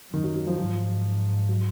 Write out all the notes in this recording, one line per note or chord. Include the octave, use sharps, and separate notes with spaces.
F#2 D#3
F#3
F#3
F3
G#2 F3
F#3